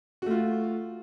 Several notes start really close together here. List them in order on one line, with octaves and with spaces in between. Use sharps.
F#4 A3 F4